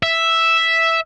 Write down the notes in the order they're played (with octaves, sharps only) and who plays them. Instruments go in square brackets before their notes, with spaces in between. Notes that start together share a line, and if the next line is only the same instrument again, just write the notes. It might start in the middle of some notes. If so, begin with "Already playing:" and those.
[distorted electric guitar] E5